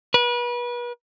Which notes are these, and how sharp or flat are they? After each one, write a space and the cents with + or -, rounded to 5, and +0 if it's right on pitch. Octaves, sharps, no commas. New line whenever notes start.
B4 -35